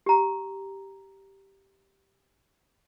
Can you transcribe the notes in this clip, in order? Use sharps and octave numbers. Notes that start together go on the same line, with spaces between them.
G4 A#5